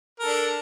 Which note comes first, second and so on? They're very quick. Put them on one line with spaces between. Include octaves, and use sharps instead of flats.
A#4 A4 D4